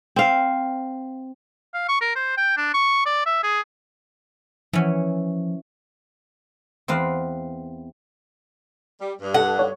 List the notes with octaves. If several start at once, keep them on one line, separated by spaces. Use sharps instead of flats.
C4 F5
F5
C#6
A#4
C5
G5
D4
C#6
D5
E5
G#4
E3 F3 C#4
E2 C4 B4 F5
G3
G2
A4 F#5
C#5